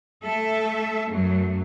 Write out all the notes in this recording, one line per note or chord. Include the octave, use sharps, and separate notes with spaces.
A3 A4 E5
F#2 F#3 A3